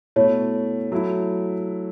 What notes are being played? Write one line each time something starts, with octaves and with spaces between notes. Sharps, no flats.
B2 A3 E4 C#5
F#3 A3 E4